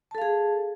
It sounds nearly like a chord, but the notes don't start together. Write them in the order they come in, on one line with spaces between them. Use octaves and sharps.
A5 A4 F5 G#4